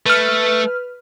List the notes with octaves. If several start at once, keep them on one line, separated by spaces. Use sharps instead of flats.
A3 B4 F6